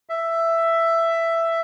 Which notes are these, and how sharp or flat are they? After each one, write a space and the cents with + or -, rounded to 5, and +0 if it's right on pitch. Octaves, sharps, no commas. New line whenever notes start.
E5 +10